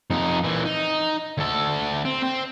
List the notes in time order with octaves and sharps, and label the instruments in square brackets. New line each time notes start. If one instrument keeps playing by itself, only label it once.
[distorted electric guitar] F2 D#4
A#2 E3
D#4
D2 A4
C4
C4